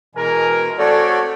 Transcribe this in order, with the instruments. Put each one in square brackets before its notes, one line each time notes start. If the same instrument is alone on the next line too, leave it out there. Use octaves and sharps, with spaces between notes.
[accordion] B2 E3 G#3 [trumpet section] A#4 G#5
[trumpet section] A3 C4 F#4 [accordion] A4 C#5 D5